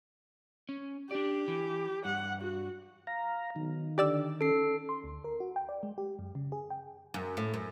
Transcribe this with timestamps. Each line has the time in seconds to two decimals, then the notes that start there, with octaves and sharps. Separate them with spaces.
0.69 C#4
1.11 D4 G4 D5
1.48 E3
2.05 G2 F#5
2.41 F#4
3.07 F5 A#5
3.56 B1 D#3
3.98 D3 G4 D5 E6
4.41 C#4 A4 C7
4.89 C6
5.04 D2
5.24 A#4
5.40 F#4
5.56 G5
5.69 D5
5.83 G#3
5.98 G4
6.19 F#2
6.35 C#3
6.52 G#4
6.70 G5
7.14 F#2
7.37 A2
7.54 F#2